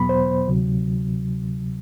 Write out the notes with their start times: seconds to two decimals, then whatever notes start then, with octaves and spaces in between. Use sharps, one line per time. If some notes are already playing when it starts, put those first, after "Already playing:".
Already playing: E2 B2 F#3 B3 B5
0.09 C5
0.48 D2 C3 F#3